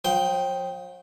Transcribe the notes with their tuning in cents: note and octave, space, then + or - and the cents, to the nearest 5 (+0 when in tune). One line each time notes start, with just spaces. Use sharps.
F3 +45 C5 -30 G5 +0